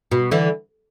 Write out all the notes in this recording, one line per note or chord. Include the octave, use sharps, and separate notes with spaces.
B2
D3 E3